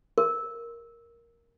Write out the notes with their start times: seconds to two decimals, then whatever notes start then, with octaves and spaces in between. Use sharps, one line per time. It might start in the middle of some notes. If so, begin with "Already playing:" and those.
0.18 A#4